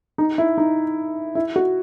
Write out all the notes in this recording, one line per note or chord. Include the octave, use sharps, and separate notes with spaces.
D#4
E4
D#4
E4
F#4